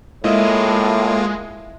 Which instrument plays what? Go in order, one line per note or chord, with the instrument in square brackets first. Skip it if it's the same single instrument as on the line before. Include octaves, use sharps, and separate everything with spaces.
[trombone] A2 [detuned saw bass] G#3 [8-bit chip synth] A#3 F4 [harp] E4 D#5 E5